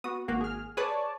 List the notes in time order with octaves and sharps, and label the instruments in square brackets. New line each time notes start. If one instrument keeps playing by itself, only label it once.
[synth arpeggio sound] B3 F#4 [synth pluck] D#6
[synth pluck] G#1 A#3 [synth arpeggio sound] F#4
[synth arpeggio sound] G#4 F6
[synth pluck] G#4 B4 [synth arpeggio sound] C#5 D5 A5